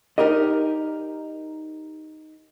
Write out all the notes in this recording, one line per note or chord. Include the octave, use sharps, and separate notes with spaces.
D#4 G4 A#4 D5 D#5